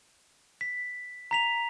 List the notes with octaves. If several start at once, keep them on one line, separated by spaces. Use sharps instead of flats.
B6
A#5 B6 F7